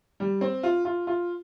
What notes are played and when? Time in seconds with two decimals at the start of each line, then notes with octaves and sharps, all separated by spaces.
0.20 G3
0.41 C4
0.63 F4
0.85 F4
1.07 F4